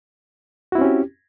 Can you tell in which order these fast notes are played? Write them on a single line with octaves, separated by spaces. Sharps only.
F#4 E4 C4 C#4 G4